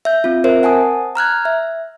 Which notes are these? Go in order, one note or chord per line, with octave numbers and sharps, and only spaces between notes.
E5 G6
C4 F4
C4 A#4 C5 E5
F#5 G#5 A5 D#6
A#5 F6 F#6 G#6
E5